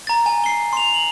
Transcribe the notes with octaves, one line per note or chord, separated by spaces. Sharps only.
A#5 A6
G#5
C7 G7
C6 F7
F#7